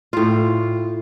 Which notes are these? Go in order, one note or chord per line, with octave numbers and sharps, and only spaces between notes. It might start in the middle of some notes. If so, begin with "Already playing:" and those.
A2 F4